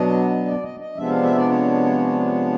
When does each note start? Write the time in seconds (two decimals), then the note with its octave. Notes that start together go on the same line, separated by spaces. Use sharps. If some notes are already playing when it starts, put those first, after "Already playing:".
Already playing: B2 F#3 B3 D4 D#5
0.46 D5
0.63 D#5
0.80 D#5
0.96 C3 F3 G#3 B3 D4 E5
1.10 F5
1.23 E5
1.36 D5
1.50 C#5